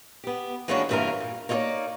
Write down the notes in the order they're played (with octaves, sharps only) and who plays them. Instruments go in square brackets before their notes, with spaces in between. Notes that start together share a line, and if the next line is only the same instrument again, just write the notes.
[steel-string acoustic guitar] B3 G4
E3 G#3 A#3 C#4 D4 F#4
G2 C3 E3 A#3 F4 A#4
A#2
A#3 D#4 F4 G#4 C#5 D5